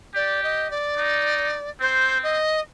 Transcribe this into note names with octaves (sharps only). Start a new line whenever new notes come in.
G4 D5
D#5
D5
D#4
C4 C5
D#5